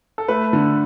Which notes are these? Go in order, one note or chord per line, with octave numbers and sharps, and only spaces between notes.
A4
A3 B4
D3